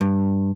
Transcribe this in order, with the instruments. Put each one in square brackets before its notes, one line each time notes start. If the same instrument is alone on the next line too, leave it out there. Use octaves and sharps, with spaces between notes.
[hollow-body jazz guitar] G2